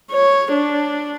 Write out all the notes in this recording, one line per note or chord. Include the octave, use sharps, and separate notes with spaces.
C#5
D4